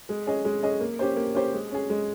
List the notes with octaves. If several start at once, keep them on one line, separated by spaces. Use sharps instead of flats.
G#3
C#4 G#4 D#5
G#3
C#4 G#4 D#5
A#3
C#4 G4 C5
A#3
C#4 G4 C5
G#3
C#4 G#4
G#3